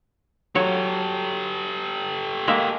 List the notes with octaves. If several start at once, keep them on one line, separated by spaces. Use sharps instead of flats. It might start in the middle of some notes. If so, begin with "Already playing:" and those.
F#3 G4 A4 C#5
G#3 A#3 E5